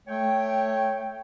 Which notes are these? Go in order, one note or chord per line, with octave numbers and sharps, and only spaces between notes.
A3 C#5 G5